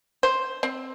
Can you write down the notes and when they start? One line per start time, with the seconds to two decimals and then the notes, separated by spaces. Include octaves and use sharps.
0.23 C5
0.63 C4